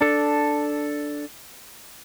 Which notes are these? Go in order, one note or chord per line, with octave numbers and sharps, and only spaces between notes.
D4 A4